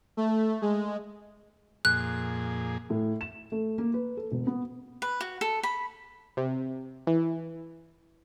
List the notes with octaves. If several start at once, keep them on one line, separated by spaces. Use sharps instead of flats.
A3
G#3
F2 A#2 G#4 F#6
A2
E7
A3
A#3
B4
A4
E1
B3
B4
F#4
A4
B5
C3
E3